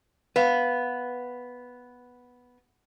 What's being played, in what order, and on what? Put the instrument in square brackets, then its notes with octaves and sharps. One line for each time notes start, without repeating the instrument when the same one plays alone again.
[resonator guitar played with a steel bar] B3 [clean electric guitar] B4 F5